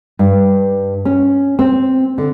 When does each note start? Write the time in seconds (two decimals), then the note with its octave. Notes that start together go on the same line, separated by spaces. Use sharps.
0.19 G2
1.05 C#4
1.59 C4
2.18 D3